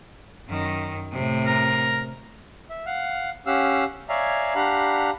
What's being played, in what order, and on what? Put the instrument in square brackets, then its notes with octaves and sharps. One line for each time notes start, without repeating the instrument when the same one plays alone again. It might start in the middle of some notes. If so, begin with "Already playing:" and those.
[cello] F#2 D#3
A2 C3
[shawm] A#4
[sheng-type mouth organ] E5
F5 F#5 F6
C#4 G4 F5 F#5 E6
C#5 D5 E5 F5 G#5 A#5
D4 G4 F5 F#5 A#5 B5